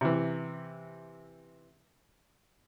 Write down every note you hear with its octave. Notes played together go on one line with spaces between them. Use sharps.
C3 E3